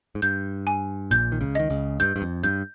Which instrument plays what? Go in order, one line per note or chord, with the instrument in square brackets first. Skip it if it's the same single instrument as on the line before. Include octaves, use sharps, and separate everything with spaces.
[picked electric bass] G#2
[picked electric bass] G2 [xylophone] G6
[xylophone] G#5
[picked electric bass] A#1 A#2 [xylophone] G6
[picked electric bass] D#3
C#2 C#3
[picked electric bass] D#3 [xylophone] D#5
[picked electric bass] C#2 C#3
[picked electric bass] G2 [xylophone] G6
[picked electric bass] G2
F2
[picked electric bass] G2 [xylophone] G6